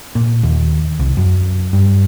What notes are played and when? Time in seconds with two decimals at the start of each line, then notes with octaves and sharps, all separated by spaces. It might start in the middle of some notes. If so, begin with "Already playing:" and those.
0.15 A#2
0.43 D#2
0.99 C2
1.17 F#2
1.73 G2